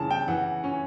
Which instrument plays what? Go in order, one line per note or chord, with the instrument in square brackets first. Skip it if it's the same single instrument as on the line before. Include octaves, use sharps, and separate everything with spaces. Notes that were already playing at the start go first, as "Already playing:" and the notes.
Already playing: [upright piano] C#3 E3 A5
G5
E3 F#5
C#4